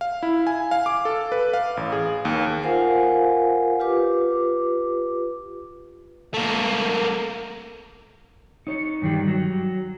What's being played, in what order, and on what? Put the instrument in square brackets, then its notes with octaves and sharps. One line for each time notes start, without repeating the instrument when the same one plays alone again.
[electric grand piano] F5
E4
G#5
F5
D6
A4
B4
F5
A1
G#4
D#2
[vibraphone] F4 A#4 C5 F5 F#5 G#5
F4 G4 B4 D6
[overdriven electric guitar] A3 A#3
[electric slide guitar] D#4 C#5
G2 D#3 G3
F#3